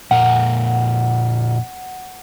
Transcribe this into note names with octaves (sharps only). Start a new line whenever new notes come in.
F2 A#2 A#4 F#5